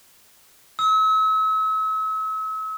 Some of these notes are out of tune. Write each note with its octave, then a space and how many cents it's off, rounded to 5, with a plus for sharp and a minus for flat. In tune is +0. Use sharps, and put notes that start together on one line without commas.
E6 -40